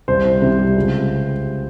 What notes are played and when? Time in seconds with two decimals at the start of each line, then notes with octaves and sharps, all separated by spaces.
0.08 C2 C5
0.25 C2
0.42 C3
0.59 G3
0.76 C#2